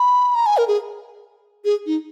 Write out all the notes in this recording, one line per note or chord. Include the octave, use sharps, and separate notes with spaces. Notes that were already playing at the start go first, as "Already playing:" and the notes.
Already playing: B5
A#5
G#5
A#4
G#4
G#4
D#4